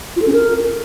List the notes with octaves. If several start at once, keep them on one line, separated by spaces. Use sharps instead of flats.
F4
A4
C#4
A#4